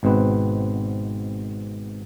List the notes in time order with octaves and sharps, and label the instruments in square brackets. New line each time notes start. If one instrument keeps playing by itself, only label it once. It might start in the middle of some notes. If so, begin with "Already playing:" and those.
[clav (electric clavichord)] G#1 G#2 B2 C4 B4